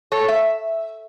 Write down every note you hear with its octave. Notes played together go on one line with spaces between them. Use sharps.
A4 C#5
E5